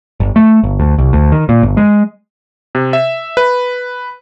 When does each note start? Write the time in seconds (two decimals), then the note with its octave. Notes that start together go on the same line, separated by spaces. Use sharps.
0.20 G1
0.36 A3
0.63 G1
0.80 D2
0.99 C2
1.13 D2
1.32 D#3
1.49 A#2
1.63 G1
1.77 G#3
2.75 C3
2.93 E5
3.37 B4